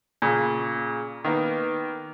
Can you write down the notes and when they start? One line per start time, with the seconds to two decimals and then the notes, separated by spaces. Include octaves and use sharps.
0.22 A#2 C#3
1.24 D#3 A#3 B3